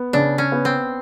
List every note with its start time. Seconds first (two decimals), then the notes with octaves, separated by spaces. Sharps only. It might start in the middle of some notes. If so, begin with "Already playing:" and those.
Already playing: B3
0.13 C#3 D4
0.38 C#4
0.52 B3
0.65 C4